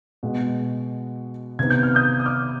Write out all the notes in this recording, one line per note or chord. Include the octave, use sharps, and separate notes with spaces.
B2 G#3 B3
C3 D#3 B3 G#6
G6
F6
D#6 G6
D#6
D6 F6